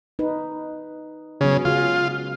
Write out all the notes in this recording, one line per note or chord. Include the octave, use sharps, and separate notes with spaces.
D#4 B4
C#3 F#3 B3 G#4
C#3 G#3 F4 G#4